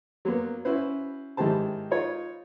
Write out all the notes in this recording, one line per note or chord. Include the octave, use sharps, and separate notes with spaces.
F#3 A#3 B3
C#4 E4 F#4 B4 C5
G#2 D#3 E4 G4 C5 A5
D#4 F4 C#5